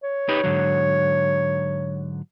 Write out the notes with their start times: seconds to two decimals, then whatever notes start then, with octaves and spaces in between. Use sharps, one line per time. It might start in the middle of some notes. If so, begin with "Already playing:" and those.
0.04 C#5
0.29 D#4 G4 B4
0.44 G#2 D3 F#3